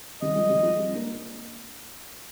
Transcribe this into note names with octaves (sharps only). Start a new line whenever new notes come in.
D#3 G3 D#5
F3 G#3
D#3 G3
F3 G#3
G#3 C4
A#3 D4